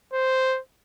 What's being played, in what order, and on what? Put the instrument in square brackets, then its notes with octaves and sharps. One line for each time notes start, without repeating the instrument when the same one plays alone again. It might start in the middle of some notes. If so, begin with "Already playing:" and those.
[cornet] C5